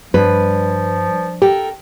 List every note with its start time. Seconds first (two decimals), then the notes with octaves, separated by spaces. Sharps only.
0.14 G2 F3 B4
1.42 G4 A4 A#4 G5